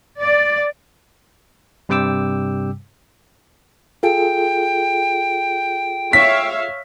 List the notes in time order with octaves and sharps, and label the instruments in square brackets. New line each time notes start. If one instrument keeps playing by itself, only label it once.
[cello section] D5
[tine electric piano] G2 C3 G3 G5 D6 E6
[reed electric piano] F4 G#4 A4 [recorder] G5
[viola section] C#5 E5 F5 [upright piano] B6